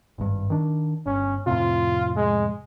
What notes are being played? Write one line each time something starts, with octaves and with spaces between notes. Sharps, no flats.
G#1 G2
D#3 D4
G1 C#4
F2 A2 C3 F4
G#3